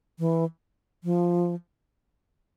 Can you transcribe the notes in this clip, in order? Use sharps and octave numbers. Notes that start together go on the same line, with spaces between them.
E3
F3